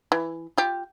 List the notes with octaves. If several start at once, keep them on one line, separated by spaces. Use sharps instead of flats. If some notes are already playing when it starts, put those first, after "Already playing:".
E3
F4 G4